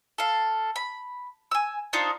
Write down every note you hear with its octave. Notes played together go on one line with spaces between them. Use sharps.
A4 F5
B5
G#5 E6
D4 D#4 F4 C5